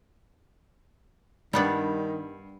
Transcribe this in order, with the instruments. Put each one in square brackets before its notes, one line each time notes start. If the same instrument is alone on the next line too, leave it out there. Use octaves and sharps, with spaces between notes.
[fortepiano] G2 [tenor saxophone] D#3 [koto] G3 B3 D4